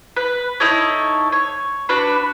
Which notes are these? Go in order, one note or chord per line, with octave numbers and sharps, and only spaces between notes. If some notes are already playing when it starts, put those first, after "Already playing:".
B4
D#4 E4 A4 C#5
C#5
D4 F#4 B4 B5